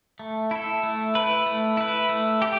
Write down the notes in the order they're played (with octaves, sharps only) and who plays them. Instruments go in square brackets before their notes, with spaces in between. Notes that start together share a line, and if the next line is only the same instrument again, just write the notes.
[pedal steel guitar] A3
E4 A4
A3
E4 B4
A3
E4 B4
A3
G4